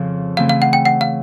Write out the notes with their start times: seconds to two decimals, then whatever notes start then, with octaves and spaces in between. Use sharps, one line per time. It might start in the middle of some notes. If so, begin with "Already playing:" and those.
Already playing: F2 C#3 F3
0.37 C#3 E3 A3 C4 F5
0.49 F5
0.62 F#5
0.73 G5
0.85 F#5
1.01 F5